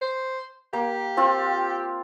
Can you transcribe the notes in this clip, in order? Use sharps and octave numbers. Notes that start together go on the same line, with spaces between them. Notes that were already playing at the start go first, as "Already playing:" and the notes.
C5
A#3 G4
C4 F4 F5